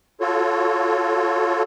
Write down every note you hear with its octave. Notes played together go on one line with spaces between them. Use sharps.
F4 F#4 A4 C#5